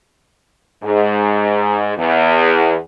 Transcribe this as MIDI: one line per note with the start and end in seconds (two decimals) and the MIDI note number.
0.84 1.92 44
1.98 2.77 40